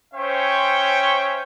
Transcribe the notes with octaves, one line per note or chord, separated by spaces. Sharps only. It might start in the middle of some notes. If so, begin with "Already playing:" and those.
C#4 C5 C#5 E5 G5